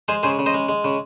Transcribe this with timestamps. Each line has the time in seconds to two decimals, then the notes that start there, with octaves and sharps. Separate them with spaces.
0.08 G#3 G#4 C5
0.23 C#3 G#4 C5
0.39 C#3
0.46 C5 D#5
0.54 G#3
0.68 G#3
0.84 C#3